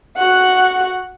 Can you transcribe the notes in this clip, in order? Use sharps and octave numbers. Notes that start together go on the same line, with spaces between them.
F#4 F#5